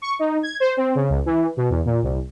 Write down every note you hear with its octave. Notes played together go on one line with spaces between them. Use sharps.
C#6
D#4
G#6
C5
C4
C#3
C#2
E3
B2
E2
A#2
C2